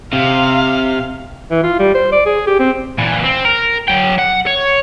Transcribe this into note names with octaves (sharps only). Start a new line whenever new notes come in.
C3 F5
E3
F4
G3
C5
D5
G#4
G4
C4
A#2 E3
C4
A#4
F#3 G5
F#5
C#5